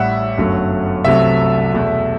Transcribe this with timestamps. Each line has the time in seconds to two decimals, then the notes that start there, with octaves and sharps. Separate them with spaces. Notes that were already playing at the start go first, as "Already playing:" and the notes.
Already playing: A1 A2 G3 E5 F#5
0.38 G1 F#2 F#3 A3
1.04 C2 C3 F#3 A3 E5
1.72 E2 B2 A3